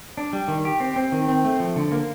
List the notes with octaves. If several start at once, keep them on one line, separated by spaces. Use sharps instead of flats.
D4
G3
D#3
G4
C4
C4
D#3
C4
A3
F3
D3
A#3